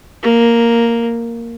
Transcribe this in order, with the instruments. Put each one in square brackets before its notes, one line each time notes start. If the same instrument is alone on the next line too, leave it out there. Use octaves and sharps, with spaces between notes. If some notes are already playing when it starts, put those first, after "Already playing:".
[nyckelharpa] A#3